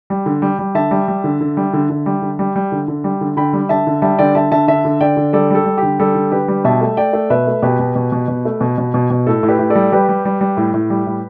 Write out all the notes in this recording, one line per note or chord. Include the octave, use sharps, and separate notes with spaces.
G3
D3
G3
G3
D3 E5 A5
G3
G3
D3
D3
G3
D3
D3
G3
D3
G3
G3
D3
D3
G3
D3
D3 G5 B5
G3
D3 E5 A5
D3
G3 E5 A5
D3 D5 G5
D3 E5 A5
D3 E5 A5
D3 E5 A5
D3
D3 D5 G5
D3
G3 A4 D5
G3 A4
G3
D3 G4
G3 A4
D3
D3 G4 B4
G3
B2 E5 A5
A3
A3 D5 G5
A3
B2 B4 E5
A3
B2 G4 B4
B2
B2
B2
B2
A3
B2
B2
B2
B2
A2 A4
A2
G4 B4
A2
A4 D5
G3
G3 G4 B4
G3
G3
G3
A2
A2
G3
A2